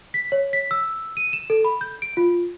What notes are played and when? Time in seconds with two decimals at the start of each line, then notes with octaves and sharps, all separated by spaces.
0.14 B6
0.32 C#5
0.53 B6
0.71 E6
1.17 D#7
1.33 E7
1.50 A4
1.65 B5
1.81 G6
2.02 D7
2.17 F4